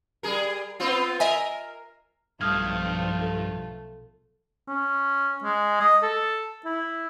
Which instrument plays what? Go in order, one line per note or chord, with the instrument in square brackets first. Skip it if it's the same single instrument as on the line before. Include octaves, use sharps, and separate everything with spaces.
[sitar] G3 G#4 A#4
B3 C4 F4
[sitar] A#4 [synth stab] D#5 E5 G#5
[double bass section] B1 F3 [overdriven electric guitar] G2 [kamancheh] A3 F4 [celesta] D#6 F6 G#6
[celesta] A4
[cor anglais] C#4
G#3
D#5
A4
E4